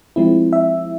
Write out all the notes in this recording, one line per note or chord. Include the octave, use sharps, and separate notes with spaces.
F3 G#3 C4 E4
E5